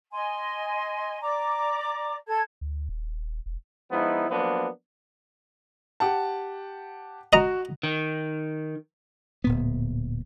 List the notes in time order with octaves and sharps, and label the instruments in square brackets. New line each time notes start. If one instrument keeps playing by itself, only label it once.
[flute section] D#5 G#5 C6
D5 A#5 D6
A4 A5 G#6
[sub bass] D2
D#1
E1
[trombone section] F3 G#3 B3 D#4 E4
F3 F#3 A#3 B3 D4
[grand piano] G4 F#5 A5
[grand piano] F#4 [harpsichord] D#5 A#5
[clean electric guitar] D#3
[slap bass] D1 A#2 B3